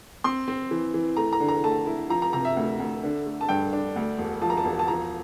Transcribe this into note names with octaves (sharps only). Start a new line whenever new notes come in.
C4 C6
C4
E3
E3
A3 A#5
A#5
D3
A#5
A3 A5
E4
F3 A#5
A#5
C3 A#5
E5
D2
D2
D3
A3
A5
G2 G5
D4
D2
E1
F3 A5
A#5
A5
E1
A5
F3 A#5